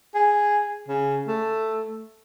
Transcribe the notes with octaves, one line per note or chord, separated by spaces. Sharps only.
G#4
C#3
A3